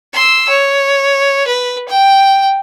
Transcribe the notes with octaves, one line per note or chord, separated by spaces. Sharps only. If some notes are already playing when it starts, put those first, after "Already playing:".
C6 E6
C#5
B4
G5